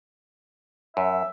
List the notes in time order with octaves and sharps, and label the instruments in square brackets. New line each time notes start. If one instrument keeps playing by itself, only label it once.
[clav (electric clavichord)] F#2 [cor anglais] E5